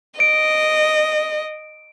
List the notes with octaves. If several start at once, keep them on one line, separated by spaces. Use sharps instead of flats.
D#5 D7